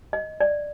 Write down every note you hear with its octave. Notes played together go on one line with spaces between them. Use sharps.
D#5
D5